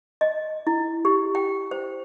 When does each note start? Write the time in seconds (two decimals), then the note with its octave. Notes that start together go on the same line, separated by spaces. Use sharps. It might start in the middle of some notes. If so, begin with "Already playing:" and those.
0.21 D#5
0.67 E4
1.05 G4
1.35 G5
1.71 C5